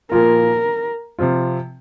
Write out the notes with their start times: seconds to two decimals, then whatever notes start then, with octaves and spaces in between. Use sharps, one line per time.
0.12 A#2 F3 A#3 F4 A#4
1.19 C3 F3 C4 F4